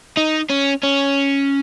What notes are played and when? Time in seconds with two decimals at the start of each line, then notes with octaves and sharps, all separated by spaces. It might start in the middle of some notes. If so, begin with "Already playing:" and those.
0.17 D#4
0.50 C#4
0.84 C#4